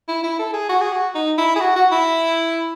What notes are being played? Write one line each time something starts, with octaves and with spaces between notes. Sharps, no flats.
E4
E4
A4
G#4
F#4
G#4
F#4
D#4
E4
G#4
F#4
F#4
E4